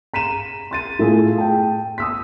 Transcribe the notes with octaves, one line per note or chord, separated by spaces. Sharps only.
A#5 B6 D#7 E7
C6 A6 D#7
A2 A3 F4 G#4
G5 A5
D#6 E6 B6